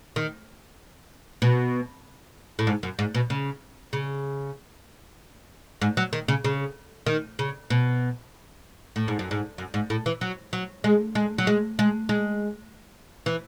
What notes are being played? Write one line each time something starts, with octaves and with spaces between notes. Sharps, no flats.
D#3
B2
A2
G#2
F#2
G#2
B2
C#3
C#3
G#2
F#3
D#3
C#3
C#3
D#3
C#3
B2
A2
G#2
F#2
G#2
F#2
G#2
A2
E3
F#3
F#3
G#3
G#3
F#3
G#3
G#3
G#3
E3